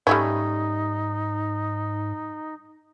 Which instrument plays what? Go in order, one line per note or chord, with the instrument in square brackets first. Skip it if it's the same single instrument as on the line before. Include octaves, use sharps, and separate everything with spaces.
[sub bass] G#2 [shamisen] G3 A3 C#4 [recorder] D#4